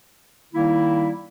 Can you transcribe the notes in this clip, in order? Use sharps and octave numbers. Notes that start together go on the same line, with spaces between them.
D#3 G3 A#3 D#4 E4